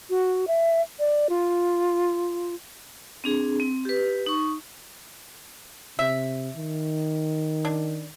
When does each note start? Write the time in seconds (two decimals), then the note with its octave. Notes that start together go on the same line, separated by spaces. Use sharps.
0.10 F#4
0.48 E5
1.00 D5
1.29 F4
3.24 C4 D4 G#4
3.60 C4
3.85 G4 B4
4.26 D#4 C#6
5.99 C3 E5
6.56 D#3
7.65 D4